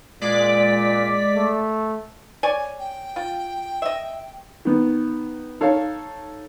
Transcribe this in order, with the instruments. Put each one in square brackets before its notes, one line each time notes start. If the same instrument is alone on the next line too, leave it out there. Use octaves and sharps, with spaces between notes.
[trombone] A#2 [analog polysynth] G#3 D5 B6
[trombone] A3
[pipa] C#5 D5 G#5
[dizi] G5
[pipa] F4
D#5 E5
[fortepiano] D#3 B3
D#4 A4 C#5 F5